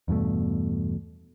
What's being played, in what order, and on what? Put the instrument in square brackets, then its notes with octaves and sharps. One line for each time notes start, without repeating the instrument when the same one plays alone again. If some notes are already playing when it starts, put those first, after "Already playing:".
[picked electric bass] E2 G2 B2 A3